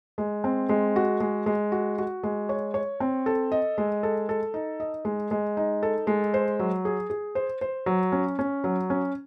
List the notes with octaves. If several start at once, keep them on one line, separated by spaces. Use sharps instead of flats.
G#3
C4
G#3
F#4
G#3
G#3
F#4
F#4
G#3
C#5
C#5
C4
A4
D#5
G#3
A4
A4
D#4
D#5
G#3
G#3
D#4
A4
G#3
C5
F#3
G#4
G#4
C5
C5
F#3
C#4
C#4
F#3
C#4